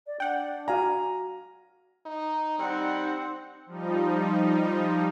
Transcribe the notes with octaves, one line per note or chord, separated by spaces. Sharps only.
D5
D4 F#5 G5
F#4 F5 G#5 A#5
D#4
G3 C4 D#4 F#5
F3 G3 D#4